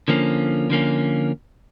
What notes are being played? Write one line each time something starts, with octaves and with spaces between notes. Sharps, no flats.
D3 F3 A#3 C#4
D3 F3 A#3 C#4